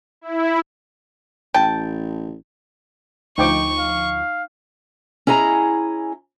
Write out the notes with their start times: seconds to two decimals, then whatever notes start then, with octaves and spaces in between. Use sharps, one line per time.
0.21 E4
1.54 A1 G5 A5
3.38 D2 F3 D#4 G5 C#6 D6
3.79 F5
5.27 C#4 E4 G#4 D#5 A#5